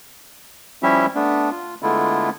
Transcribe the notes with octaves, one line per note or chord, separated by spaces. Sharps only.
F3 G3 C#4 E4 G4 E5
A3 B3 D4
F4
D3 G#3 A3 B3 E4 F4